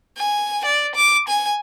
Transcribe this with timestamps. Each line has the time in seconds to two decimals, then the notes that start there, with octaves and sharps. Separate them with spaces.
0.18 G#5
0.66 D5
0.96 D6
1.29 G#5